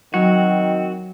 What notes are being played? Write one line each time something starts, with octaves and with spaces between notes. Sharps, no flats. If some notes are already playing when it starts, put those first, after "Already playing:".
D#3 F#3 C4 F#4